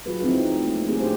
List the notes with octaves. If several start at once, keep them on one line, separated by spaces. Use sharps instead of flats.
F#3 F4 F#4 G#4 B4
F3 C4 D#4 E4
A3
G3 A3 A#3 C4
A3 C4 G4 G#4
G3 D4 D#4 F#4 G4 C5